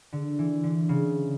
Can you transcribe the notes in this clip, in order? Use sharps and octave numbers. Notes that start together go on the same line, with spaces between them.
D3
E3
D3
C#3